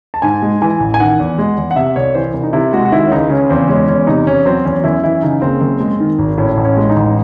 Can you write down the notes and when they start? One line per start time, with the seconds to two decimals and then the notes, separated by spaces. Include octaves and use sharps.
0.14 A5
0.22 G#2 G#5
0.42 G#3
0.62 E3 G#5
0.80 A1
0.94 G#5
1.00 D#3 F#5
1.20 E2
1.38 G#3
1.57 E2
1.71 F#5
1.76 C3 E5
1.96 C2 C#5
2.15 E3 C5
2.34 C2
2.43 D#4
2.53 C3 E4
2.73 G#3 F#4
2.85 F#4
2.92 D#3 E4
3.06 C#4
3.11 C#2 D#4
3.30 C#3 C#4
3.50 E2 C4
3.69 G#3 C#4
3.88 E2 C#4
4.07 C3 D#4
4.26 E2 C#4
4.45 F#3 C4
4.65 E2 C#4
4.84 F#2 E4
5.04 E3 E4
5.22 C#3 D#4
5.42 F#1 C4
5.61 F#2
5.80 G#3
6.00 D#3
6.19 G#1
6.38 A2 C#4
6.57 A1
6.65 C#4
6.77 G#3
6.90 D#4
6.96 A1